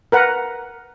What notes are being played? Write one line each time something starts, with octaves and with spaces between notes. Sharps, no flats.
A#4 B4 F#5